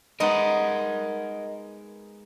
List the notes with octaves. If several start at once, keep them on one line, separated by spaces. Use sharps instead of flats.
G#3 B3 D#4 A#4 D#5 F#5